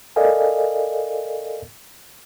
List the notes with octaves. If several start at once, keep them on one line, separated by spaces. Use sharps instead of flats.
A4 A#4 D5 D#5 F5 G#5